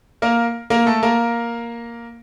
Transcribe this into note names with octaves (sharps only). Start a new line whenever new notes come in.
A#3 A#4
A#3 A#4
A3 A4
A#3 A#4